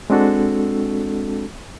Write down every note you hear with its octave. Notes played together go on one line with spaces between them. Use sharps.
G#3 C4 D4 F#4 A4